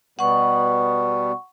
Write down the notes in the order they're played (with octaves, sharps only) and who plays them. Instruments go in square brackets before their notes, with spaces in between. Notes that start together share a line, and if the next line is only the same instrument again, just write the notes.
[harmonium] B2 G3 B3 [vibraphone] F#5 C#6